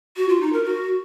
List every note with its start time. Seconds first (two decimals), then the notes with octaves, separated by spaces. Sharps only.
0.17 F#4
0.29 F4
0.41 D#4
0.53 A#4
0.65 F#4